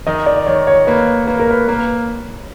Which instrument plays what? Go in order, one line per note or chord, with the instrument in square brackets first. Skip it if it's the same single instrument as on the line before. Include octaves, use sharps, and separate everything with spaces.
[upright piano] D#3 [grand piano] D#5
[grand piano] D5
[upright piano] D#3 [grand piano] C#5
[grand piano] C#5
[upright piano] A#3 [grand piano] B4
[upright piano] A#3 [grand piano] B4
[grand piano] A#4
B4
[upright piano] A#3 [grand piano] B4